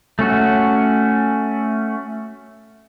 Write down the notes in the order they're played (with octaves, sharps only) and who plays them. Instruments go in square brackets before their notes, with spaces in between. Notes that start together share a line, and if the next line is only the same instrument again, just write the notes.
[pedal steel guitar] A3 C#4 F#4